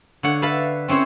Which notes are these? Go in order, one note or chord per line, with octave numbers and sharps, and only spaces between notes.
D3 C#5 F#5
B4 E5 F5 A5 B5
C4 C#4 E4 C5 C#5